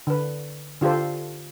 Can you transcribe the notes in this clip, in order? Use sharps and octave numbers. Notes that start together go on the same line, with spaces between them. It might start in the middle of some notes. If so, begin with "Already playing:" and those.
D3 B4
D3 F4 G4 A4 C5